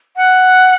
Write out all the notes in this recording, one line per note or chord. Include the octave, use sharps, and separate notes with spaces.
F#5